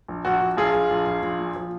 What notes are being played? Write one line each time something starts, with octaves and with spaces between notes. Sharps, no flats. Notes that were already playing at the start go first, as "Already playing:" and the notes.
A#1
A#1 F#4
A#1
A#1 F4 G#4
A#1
A#1
A#1
A#1
A#2
F3